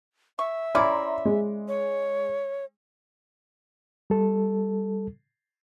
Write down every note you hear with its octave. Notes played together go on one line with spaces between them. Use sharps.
E5 C#6
C#4 E4 D5 A#5 C6
G#3
C#5
G3 A4